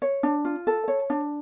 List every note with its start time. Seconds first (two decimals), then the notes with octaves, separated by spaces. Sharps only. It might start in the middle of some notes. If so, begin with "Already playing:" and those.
0.02 C#5
0.23 D4
0.45 F4
0.67 A4
0.88 C#5
1.10 D4